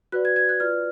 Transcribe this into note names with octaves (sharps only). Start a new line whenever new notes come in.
F#4 B4 D5 F#6
G#6
G#6
F#6
F4 B4 D5 F6